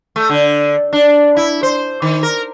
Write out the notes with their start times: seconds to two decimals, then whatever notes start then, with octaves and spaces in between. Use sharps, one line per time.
0.16 A3
0.29 D3
0.93 D4
1.37 E4
1.63 C5
2.02 D#3
2.23 A#4